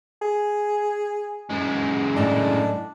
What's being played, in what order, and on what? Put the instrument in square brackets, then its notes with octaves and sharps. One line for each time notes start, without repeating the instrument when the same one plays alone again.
[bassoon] G#4
[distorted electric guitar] F#2 G#3
[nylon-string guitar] A2 D#5 A5 [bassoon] D4